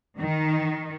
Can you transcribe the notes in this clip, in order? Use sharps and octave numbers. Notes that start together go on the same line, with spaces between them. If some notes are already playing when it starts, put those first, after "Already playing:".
D#3